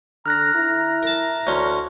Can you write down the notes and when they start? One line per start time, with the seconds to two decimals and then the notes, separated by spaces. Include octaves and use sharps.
0.26 D3 A#5 F6 F#6 A#6
0.55 E4 A#5
1.03 A#4 A5
1.47 D2 C#4 C6